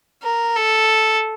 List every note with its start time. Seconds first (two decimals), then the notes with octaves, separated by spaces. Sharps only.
0.23 A#4
0.56 A4